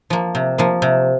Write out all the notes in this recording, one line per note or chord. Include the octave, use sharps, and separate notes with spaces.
F3 A#3
C3
F3 A#3
C3